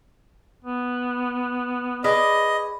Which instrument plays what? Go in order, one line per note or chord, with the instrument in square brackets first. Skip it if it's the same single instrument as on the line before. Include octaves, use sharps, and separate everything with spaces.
[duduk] B3
[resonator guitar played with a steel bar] G#4 B4 D5 [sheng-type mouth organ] D#5